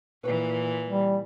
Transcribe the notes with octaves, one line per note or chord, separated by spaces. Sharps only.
A#2 E3 B4 G5
G3